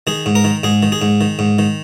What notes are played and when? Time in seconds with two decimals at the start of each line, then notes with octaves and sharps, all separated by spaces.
0.07 D#3 G#4
0.26 G#2
0.35 A#4
0.44 D#3
0.63 G#2 G#4
0.83 D#3
0.92 G#4
1.02 G#2
1.21 D#3
1.39 G#2
1.59 D#3